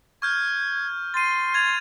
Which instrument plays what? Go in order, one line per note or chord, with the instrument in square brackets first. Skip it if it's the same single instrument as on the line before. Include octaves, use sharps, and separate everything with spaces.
[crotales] C#6 F6 G6 [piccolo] G#6
[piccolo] C6 [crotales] A6 D#7
[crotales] G#6 A6 F7